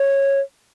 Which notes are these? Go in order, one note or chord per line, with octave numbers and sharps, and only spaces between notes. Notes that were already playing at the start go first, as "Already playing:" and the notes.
Already playing: C#5